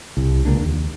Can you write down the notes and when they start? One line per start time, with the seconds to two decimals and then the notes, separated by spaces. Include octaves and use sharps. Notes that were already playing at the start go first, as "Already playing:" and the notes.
0.17 C2
0.45 C#2 A#3 D4
0.62 D#2